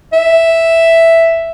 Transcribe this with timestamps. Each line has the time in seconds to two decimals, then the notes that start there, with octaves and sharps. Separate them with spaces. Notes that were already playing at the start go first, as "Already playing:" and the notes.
0.13 E5